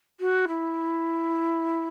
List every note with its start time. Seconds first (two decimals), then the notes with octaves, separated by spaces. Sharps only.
0.20 F#4
0.48 E4